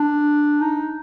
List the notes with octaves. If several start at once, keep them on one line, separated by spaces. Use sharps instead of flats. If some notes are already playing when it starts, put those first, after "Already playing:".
Already playing: D4
D#4